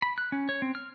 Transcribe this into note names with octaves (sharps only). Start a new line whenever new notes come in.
B5
F#6
C#4
C#5
C4
F6